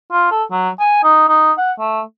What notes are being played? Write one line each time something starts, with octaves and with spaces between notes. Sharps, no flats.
F4
A4
F#3
G#5
D#4
D#4
F#5
A3